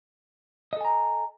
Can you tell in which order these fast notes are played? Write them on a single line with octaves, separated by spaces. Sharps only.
D#5 A4 G#5 A#5